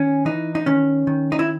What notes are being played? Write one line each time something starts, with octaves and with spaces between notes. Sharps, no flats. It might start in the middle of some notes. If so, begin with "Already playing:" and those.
Already playing: D#3 C#4
E3 D#4
D#4
D#3 C#4
D#3
D#4
E4